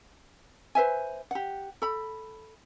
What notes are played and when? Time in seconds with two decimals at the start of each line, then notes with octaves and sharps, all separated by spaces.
0.75 B4 C5 E5 G#5
1.31 G4 F#5
1.82 A4 B5